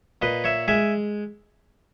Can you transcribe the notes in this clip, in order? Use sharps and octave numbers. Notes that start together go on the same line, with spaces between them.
A#2 B4 D#5
C#5 E5
G#3 E5 G#5